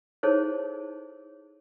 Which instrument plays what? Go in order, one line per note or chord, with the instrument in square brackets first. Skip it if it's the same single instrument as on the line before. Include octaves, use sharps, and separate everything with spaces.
[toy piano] D#4 E4 G#4 A4 C5 C#5